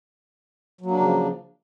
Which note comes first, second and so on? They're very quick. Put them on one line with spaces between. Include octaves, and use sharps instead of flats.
F#3 A#3 D4 C#3 F3